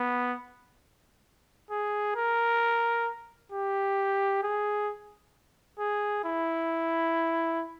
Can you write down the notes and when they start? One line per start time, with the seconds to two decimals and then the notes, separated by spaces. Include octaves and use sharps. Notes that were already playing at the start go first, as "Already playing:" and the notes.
Already playing: B3
1.71 G#4
2.16 A#4
3.52 G4
4.43 G#4
5.79 G#4
6.24 E4